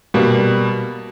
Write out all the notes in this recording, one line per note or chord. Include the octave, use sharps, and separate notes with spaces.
B2 G3 A#3